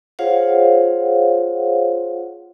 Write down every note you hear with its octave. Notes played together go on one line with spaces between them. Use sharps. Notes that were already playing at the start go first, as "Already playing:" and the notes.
F4 G#4 C5 C#5 F5 F#5